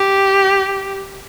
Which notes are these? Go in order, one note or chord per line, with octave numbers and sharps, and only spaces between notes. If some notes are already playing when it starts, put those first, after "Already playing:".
Already playing: G4